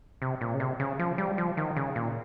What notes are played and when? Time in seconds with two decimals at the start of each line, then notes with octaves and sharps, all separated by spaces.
0.22 C3
0.41 A#2
0.54 C#3
0.60 C3
0.80 C#3
0.99 F3
1.18 G3
1.38 F3
1.57 D#3
1.77 C#3
1.96 A#2